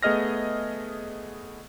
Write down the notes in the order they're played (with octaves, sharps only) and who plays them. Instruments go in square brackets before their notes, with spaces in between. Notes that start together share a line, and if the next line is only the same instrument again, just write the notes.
[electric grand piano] A3 B3 G#4 D#5 F6 A#6